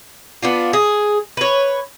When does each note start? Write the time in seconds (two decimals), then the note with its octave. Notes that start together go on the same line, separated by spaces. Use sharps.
0.42 B3 D4 F4
0.73 G#4
1.37 B4 C#5